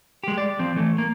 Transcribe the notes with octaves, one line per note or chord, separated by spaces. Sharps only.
G#3 G4
D5
F3 C4
E3 A3
A#3